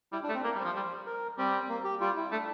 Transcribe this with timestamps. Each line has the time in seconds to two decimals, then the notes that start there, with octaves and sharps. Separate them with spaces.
0.12 G3 E4
0.23 D4
0.29 A3
0.34 C4
0.44 A#3 A#4
0.55 G3
0.60 F3 C5
0.75 G3
1.06 A#4
1.38 G3 C4
1.69 A#3
1.84 G4
2.01 G3 F4
2.16 E4
2.32 A3 D4